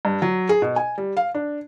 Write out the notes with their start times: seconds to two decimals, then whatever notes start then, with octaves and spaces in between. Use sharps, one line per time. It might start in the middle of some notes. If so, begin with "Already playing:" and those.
0.05 G2
0.22 F#3
0.49 G#4
0.62 B2
0.76 G#5
0.98 G3
1.17 F5
1.35 D4